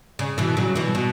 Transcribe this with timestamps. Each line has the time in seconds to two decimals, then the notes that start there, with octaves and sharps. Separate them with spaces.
0.19 C#3
0.38 B2 E3
0.57 C#3 F#3
0.75 B2 E3
0.95 B2